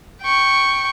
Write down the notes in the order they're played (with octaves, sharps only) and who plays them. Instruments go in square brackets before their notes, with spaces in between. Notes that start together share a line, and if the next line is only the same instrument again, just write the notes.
[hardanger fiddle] G5 C#6